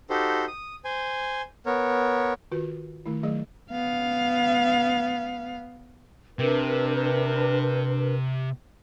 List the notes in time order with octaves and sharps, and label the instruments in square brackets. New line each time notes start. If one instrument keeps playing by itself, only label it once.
[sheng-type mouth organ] D#4 F#4 G4 A4 C5
D#6
C5 G#5
B3 A#4 C#5
[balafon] D#3 F4 F#4 B4
D#3 A3 E4
D#3 F#3 A3 G#4 D#5
[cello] B3 F5
[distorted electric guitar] C3 [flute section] D4 A#4 B4